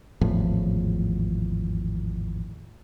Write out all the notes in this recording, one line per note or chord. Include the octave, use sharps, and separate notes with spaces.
G#1 E2 A2 F3